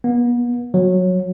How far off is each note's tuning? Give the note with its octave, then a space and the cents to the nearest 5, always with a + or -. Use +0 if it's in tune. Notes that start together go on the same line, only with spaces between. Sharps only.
B3 -40
F#3 -15